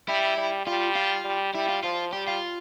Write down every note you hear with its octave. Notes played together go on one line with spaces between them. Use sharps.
G3 E4
G3
G3 F4
F4
G3
G3 E4
F4
F3 F4
G3 G4
F4